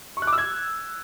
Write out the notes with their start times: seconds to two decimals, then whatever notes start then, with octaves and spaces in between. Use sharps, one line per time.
0.17 C#6
0.22 F#6
0.27 D6
0.33 E6
0.38 G#6